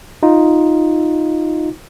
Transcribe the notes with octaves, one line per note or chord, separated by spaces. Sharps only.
D#4 F4